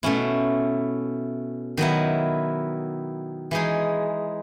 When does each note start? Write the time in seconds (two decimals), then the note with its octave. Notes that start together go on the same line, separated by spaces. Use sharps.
0.03 B2 A3 C#4 E4
1.77 D#3 F#3 B3 E4
3.51 E3 G#3 D#4 G#4